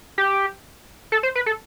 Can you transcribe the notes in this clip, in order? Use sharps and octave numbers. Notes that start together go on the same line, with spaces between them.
G4
A4
C5
B4
A4